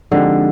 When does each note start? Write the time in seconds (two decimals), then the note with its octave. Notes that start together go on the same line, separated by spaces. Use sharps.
0.11 D3 F3 G#3 C4 D#4 G4